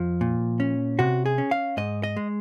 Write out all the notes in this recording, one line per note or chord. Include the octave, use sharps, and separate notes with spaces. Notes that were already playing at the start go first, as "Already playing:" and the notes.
Already playing: F2 F3
A#2
C#4
C3 F#4
G#4
C#4
F5
G#2 D#5
D#5
G#3